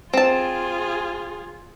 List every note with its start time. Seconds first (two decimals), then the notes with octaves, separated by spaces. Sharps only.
0.13 C4 F4 G#4 A5